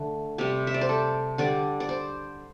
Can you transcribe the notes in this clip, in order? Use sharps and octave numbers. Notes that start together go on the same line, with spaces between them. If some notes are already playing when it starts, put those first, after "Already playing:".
Already playing: D3 A3
C3 G3 G4
E5
D5
C5
A4
D3 G3 D5
D5
C5